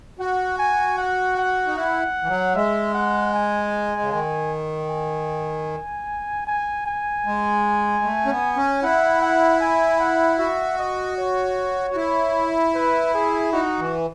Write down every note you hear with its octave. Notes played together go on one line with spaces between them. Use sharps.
F#4 F#5
G#5
F#5
F#5
D#4
E4 F#5
E3
F#3
G#3 E5
F#5
G#5
C#3
D#3 G#5
G#5
G#5
G#5
G#3
A3
C#4
B3
C#4
E4 F#5
F#5
G#5
F#5
F#4 E5
D#5
C#5
F#4
E4
B4
G#4
D#4 F#4
E3